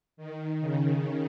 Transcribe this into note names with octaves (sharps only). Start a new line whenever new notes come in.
D#3
C#3